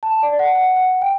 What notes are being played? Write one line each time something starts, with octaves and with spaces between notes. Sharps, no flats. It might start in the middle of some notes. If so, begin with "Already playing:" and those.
A5
D5
F#5
F#5
F#5
G5